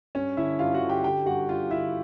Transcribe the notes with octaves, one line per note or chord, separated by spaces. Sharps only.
G2 C#4 C#5
D3 E4 E5
G2 F4 F5
F#4 F#5
D3
G4 G5
D3 G4 G5
G2 F#4 F#5
G2 F4 F5
D3 E4 E5